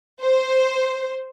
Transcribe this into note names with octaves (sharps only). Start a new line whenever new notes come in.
C5